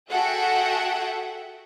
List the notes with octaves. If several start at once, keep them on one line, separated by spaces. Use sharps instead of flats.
F#4 G#4 A4 E5 F#5 G5